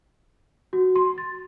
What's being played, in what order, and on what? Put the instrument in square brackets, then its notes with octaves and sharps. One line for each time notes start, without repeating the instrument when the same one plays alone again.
[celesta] F#4
C6
A6